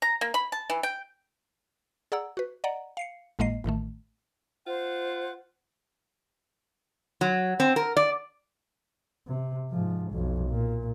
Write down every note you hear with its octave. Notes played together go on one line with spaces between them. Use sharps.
A#5
A#3
B5
A5
E3
G5
G#4 D5 F#5 A#5 E6
F#4 B4
D5 D#5 F#5 A#5
F5 C7 C#7
G#1 A2 G#3 A#3 D#5 C7
A1 A2 D#3 A3
F4 C5 F#5
F#3
C4
A#4
D5
C3
G#2 F3
B1 F2
A#2